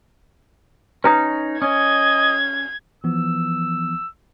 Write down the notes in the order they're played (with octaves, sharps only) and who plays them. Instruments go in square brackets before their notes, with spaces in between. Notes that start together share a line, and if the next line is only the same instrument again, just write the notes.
[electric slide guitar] C#4 D#4 [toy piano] B4 A#5 D#6
[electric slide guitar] C#4 [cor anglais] D#5 [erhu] G#6
[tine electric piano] E3 F3 B3 [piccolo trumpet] E6